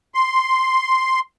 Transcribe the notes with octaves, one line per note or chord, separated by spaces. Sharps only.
C6